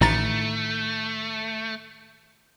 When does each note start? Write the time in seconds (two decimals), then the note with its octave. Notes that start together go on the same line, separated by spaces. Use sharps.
0.01 A1 A2 D#3 A3 A#5 A6